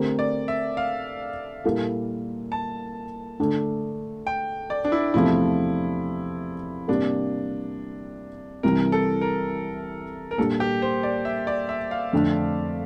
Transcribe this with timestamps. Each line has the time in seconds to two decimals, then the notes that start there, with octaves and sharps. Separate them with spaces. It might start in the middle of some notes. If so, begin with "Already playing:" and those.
Already playing: D3 A3 C4 G4 A#4
0.19 D5
0.48 E5
0.77 F5
1.64 A#2 G3 A#3 E4 A4
2.52 A5
3.39 D3 A3 D4 A4
4.27 G5
4.70 D5
4.85 D4
4.92 E4
5.14 E2 C3 F3 A3 E4
6.88 C3 G3 A#3 D4
8.63 C2 C3 E3 G3 A#4
8.92 A4
9.21 A#4
10.31 A#4
10.38 A#2 G3 D4 A4
10.60 G4
10.82 C5
11.03 D5
11.25 E5
11.47 D5
11.69 E5
11.91 F5
12.13 F2 D3 A3 D4